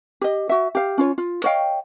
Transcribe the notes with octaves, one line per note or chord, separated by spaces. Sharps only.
G4 D#5
F#4 E5
G4 F5
C#4 F4 C#5
F4
C#5 D#5 F5 G5